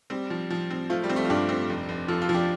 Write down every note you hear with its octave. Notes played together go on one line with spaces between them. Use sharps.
G3 C4
F3
F3
C4
F3 A3 F4
G3
C4
F3 A3
F4
G2 D4 G4
C4
F1
F1
F3 F4 A4
F4 A4
F3
D4 G4